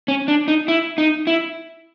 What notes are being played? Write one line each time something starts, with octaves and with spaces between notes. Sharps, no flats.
C#4
D4
D#4
E4
D#4
E4